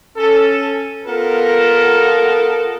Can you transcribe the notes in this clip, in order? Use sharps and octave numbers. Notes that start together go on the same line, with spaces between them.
C#4 A4
B3 F4 A4 A#4